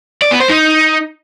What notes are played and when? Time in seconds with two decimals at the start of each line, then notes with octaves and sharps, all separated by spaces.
0.22 D5
0.31 B3
0.40 C5
0.49 D#4